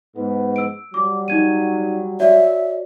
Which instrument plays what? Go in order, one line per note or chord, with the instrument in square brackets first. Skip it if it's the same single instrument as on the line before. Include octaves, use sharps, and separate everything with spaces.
[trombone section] G#2 B3
[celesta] E6 D7
[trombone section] F#3 G3 [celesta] D6
[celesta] D#4 G#6 D#7
[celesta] F#4 C#5 D5 [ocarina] E5